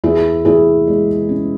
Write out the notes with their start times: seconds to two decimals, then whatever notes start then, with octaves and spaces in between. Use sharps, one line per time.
0.04 E2 E4 G#4
0.45 E2 E4 G#4
0.87 G#3
1.29 C#4